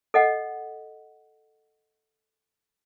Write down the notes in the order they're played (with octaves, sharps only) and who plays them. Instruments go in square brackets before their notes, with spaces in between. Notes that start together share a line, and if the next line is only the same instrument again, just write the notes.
[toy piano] A4 D#5 F#5